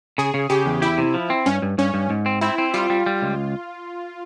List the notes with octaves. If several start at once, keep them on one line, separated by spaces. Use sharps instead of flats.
C#3 G#4
C#3
C#3 G4
E2
E4 G4
C3
F3
C4
G2 C#4
G2
G2 C#4
G2
G#2
C4
C4 E4
C4
G3 F4
G3
G3
C#2